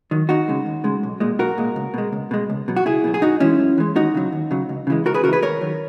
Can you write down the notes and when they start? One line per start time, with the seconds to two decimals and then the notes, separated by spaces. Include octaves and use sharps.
0.11 D#3 F#3
0.29 D#2 D#4 F#4
0.48 C#3 G#3
0.66 D#2
0.84 C#3 G#3
1.03 B1
1.20 A#2 G#3
1.39 B1 F#4 A#4
1.58 A#2 G#3
1.76 C#2
1.94 B2 G#3
2.13 C#2
2.31 B2 G#3
2.50 C#2
2.68 B2 F#3
2.77 F#4
2.86 C#2 E4 G#4
3.04 B2 F#3
3.14 G#4
3.22 F#2 D#4 F#4
3.40 E3 G#3 C#4 E4
3.59 F#2
3.78 E3 G#3
3.95 D#2 D#4 F#4
4.14 C#3 F#3
4.32 D#2
4.51 C#3 F#3
4.69 C#2
4.87 C#3 E3 G#3
5.05 C#2 F#4 A#4
5.14 G#4 B4
5.24 C#3 E3 G#3 F#4 A#4
5.33 G#4 B4
5.42 D#2 A#4 C#5
5.61 D#3 F#3